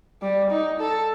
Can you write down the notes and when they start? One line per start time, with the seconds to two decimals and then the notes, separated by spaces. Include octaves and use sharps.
0.22 G3
0.51 D#4
0.80 A4